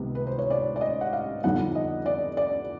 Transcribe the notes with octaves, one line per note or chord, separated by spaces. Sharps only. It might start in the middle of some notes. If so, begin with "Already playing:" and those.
Already playing: C#2 C3 D#3 G3 B3
B4
C5
C#5
D5
D5
D#5
F#5
F5
F2 D3 G3 B3 D#4 F#5
D#5
D5
D5